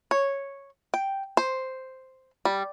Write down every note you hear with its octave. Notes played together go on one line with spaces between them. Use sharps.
C#5
G5
C5
G3